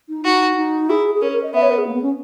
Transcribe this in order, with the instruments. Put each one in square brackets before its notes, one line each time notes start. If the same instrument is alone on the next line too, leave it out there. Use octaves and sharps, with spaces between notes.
[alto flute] D#4
[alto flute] D#4 [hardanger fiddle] F#4
[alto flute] D#4
[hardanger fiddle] E4 [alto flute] G#4
[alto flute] G#4
[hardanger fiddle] C#4 [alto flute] A#4
[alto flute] A#4
D#5
[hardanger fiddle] B3 [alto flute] E5
[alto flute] C#5
A#4
G#4
A#3
B3
C#4